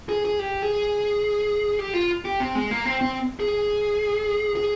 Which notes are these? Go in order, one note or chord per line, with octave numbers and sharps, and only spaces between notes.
G#4
G#4
G4
G#4
G4
F4
G4
C4
G#3
A#3
C4
C4
G#4
G#4